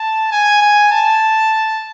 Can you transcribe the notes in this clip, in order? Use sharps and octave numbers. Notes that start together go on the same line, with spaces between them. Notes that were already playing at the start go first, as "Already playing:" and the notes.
Already playing: A5
G#5
G#5
A5